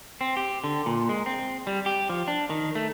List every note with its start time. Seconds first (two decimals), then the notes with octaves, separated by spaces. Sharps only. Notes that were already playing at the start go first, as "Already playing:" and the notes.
0.21 C4
0.37 G4
0.64 D3
0.86 A#2
1.09 G#3
1.26 C4
1.67 G3
1.86 G4
2.10 F3
2.28 D4
2.50 D#3
2.75 A3